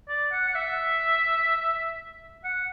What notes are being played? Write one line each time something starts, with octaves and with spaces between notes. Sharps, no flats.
D5
F#5
F#5
E5
F#5